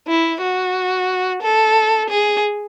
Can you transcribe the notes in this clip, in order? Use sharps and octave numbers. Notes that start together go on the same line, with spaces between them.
E4
F#4
A4
G#4